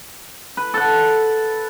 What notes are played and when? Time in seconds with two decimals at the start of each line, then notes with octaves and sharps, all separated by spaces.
0.57 B4
0.74 A4 F#5